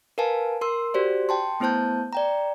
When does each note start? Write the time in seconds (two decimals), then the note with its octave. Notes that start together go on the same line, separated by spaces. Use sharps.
0.18 A#4 B4 F5 G#5 A5
0.61 A#4 C6 E6
0.94 F#4 G4 C5 D5
1.29 G5 A5 C6
1.60 A3 B3 E4 C5 A5 G6
2.13 D5 G5 A#5